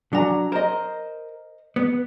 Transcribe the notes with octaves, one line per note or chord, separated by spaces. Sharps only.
F#3 D4 A#5
A#4 C5 D#5
B3